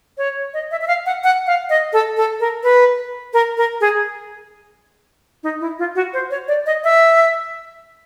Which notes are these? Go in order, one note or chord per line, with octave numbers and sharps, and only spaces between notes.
C#5
D#5
E5
E5
F5
F#5
F#5
F5
D#5
A4
A4
A#4
B4
A#4
A#4
G#4
D#4
E4
F4
F#4
C5
C#5
D5
D#5
E5